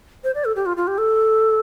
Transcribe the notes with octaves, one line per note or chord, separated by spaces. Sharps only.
C5
D5
A4
G4
F4
F4
G4
A4